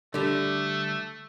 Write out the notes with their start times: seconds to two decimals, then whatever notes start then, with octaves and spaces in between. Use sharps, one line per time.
0.14 D3 G3 A3